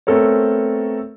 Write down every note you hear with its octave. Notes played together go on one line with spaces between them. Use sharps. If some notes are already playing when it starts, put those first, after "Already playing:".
A3 B3 C4 A4 A#4 C#5